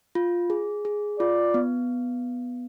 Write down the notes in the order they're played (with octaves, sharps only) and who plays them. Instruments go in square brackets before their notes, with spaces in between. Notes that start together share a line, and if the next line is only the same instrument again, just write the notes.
[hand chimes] F4
G#4
G#4
[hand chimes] F4 [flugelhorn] D5
[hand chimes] B3